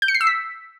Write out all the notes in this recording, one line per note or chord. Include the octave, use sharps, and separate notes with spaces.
G6
C#7
C7
E6
B6